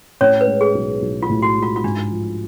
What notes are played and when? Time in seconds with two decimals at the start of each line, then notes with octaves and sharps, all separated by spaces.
0.21 A2 C#4 C#5
0.41 B4
0.47 G#3
0.61 G#4
0.74 B1
1.02 B1
1.22 F4
1.29 A2
1.42 F#4
1.56 G#3
1.63 F4
1.76 F4
1.84 G#2 D4
2.11 F3